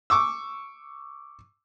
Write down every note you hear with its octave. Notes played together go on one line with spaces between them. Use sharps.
C#6 D6 E6